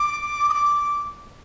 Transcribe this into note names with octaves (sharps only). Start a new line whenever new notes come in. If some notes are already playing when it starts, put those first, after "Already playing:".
Already playing: D6
D#6
D6